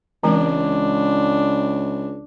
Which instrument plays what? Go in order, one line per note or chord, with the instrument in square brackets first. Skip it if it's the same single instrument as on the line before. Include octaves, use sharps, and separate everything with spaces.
[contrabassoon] C#2 [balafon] E3 G#3 C4 [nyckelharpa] D4